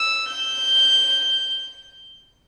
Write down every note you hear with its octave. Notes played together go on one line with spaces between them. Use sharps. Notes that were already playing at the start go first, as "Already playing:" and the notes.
Already playing: E6
G6